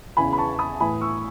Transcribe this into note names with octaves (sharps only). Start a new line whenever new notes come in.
E2 C#3 E3 G#5 B5
B5
A5 C#6
B5 D#6
A2 E3 G#5 B5
C#6 E6